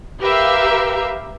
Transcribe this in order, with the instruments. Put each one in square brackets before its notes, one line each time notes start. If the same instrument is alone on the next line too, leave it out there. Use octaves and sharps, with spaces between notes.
[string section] G4 A#4 B4 E5 F5